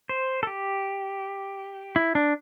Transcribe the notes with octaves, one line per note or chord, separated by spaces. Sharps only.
C5
A4
G4
E4
D4